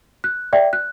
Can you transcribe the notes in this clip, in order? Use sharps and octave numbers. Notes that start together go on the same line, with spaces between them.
F#6
D5 E5 G5
F#6